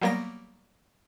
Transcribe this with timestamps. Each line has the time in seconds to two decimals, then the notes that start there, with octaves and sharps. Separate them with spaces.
0.02 F#3 G3 A#3 B3 A#6 D7